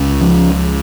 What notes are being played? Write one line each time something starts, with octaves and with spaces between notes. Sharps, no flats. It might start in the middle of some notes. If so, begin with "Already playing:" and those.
Already playing: C#2 C#3
F3